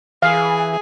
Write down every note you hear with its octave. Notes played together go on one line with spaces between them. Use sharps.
E3 G#4 F5